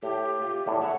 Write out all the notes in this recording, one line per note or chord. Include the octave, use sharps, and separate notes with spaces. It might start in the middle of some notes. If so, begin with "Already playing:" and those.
A2 G4
F4
E2 A2
C#5 E5 F#5